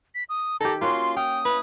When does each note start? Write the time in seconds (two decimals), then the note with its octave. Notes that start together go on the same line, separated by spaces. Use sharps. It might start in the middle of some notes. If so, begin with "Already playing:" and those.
0.15 B6
0.29 D#6
0.60 D#3 G4 A4 A#5
0.81 A#3 C#4 F4 F#4 C6
1.16 F5 G5 D#6
1.45 E4 B4